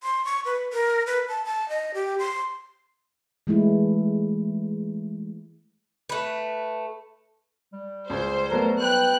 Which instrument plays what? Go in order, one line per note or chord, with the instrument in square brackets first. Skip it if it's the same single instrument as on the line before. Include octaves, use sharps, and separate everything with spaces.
[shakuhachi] C6
C#6
B4
A#4
B4
A5
A5
D#5
G4
C6
[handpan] E3 G#3 A3 E4
[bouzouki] A3 B4
[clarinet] G3
[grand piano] C#2 [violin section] C5
[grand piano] F#3 B3 [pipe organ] A3 A4 A#4
[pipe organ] B4 G5 [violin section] F#6